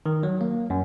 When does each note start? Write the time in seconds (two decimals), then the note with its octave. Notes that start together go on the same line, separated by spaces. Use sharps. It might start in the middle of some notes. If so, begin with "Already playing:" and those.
0.06 D#3
0.23 F#3
0.41 A#3
0.70 F#2